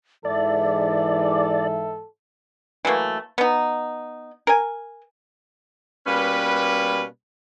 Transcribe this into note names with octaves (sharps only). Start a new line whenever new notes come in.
G#2 E3 A4 D5 E5
E3 F#3 A3 A#3
B3 D#4
A#4 G#5
B2 G3 A#3 C#4 B4